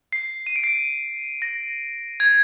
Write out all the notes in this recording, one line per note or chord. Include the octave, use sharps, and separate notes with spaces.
C7
D#7
D7
C7
A#6
G#6